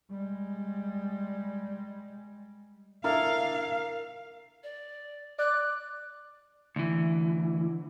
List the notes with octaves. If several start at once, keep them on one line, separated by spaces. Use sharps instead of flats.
G3 G#3
D4 E4 A4 A#4 F5
D5
D5 F#6
D2 E3